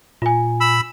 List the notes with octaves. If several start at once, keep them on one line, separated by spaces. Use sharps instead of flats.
A#2 F4 G#5
B5 E6